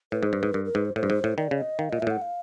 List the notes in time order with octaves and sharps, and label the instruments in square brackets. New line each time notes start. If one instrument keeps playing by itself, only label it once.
[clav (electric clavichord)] A2 [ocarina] B4
[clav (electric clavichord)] G#2 [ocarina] C5
[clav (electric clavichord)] G2
[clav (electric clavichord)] G#2 [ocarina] B4
[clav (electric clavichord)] G2 [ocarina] A#4
[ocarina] A#4
[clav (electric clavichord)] G#2 [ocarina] B4
[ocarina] C5
[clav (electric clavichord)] A2 [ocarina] C5
[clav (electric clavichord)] G2
G#2
A2
[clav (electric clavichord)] D#3 [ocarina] D5
[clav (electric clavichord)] C#3
[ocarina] D#5
[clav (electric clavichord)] D#3 [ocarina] F5
[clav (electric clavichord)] A#2 [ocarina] D#5
[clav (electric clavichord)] A#2 [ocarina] E5
[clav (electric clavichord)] A2 [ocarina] F#5
[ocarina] F5